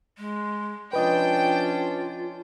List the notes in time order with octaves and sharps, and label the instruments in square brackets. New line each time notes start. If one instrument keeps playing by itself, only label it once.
[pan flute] G#3
[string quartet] F3 C#4 D4 [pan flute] F4 [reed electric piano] B4 D#5 [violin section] G5